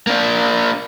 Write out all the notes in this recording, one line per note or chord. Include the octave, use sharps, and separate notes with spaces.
A#3 D4